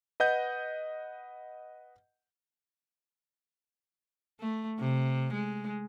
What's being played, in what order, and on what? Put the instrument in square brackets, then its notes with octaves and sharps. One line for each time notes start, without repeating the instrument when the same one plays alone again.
[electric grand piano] B4 D#5 F#5 G6
[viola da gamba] A3
C3
G#3